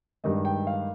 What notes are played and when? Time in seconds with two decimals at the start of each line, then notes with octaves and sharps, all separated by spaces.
0.24 G2 D#3 G#3 D#5
0.45 G5
0.67 F5